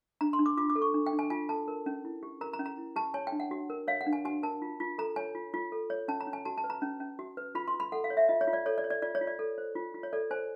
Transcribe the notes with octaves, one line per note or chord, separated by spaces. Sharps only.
D4 A#5
C6
D4
D6
F4 D6
D6
A4
C#6
D4
G5
D4
G#5
F4 G#5
A4 A5
A#4
C#4
E4
G4
A#4 A#5
A#5
C#4
A#5
E4
G4 A5
C#5 G#5
G5
D4
F#5
F#4
A#4
C#5 F5
F#5
D4
G#5
F#4 G#5
A#4 A5
F4
F4
A4 A#5
C#5 G#5
F4
F4
A4
C#5
C#4 A5
A#5
C#4
G#5
F#4 A5
A5
B4
A#5
C#4
C#4
F#4
B4
F4 B5
C6
F4
B5
A4 F#5
F5
C#5
E5
F4 D#5
C#5
F4
D5
A4 C#5
D5
C#5
D5
F4 D5
C#5
F4
D5
A4
C5
F4
F4
C#5
A4 D5
C5 G#5